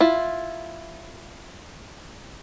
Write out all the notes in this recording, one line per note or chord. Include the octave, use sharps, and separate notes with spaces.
E4 F4